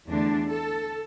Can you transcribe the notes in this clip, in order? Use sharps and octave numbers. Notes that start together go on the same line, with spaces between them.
E2 D3 A3 D4
A4